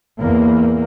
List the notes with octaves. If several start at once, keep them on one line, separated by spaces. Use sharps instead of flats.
E2 A#3